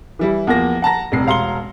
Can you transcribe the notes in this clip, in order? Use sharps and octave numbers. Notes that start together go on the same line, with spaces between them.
E3 G3 E4
E2 F3 A#3 A#6
F#5 A5 A#5 A#6
F1 C2 C7
E1 F5 A#5 C6 C#7 G7